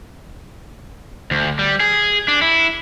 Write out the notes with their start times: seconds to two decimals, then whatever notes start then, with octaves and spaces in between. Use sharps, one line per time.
1.31 D2
1.59 G3
1.80 G#4
2.28 D4
2.42 E4